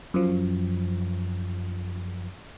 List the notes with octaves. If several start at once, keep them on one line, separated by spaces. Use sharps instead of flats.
F#2 F3